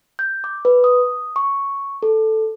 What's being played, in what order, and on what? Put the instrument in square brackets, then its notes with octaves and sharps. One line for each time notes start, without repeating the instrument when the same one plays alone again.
[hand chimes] G6
D6
B4
D#6
C#6
A4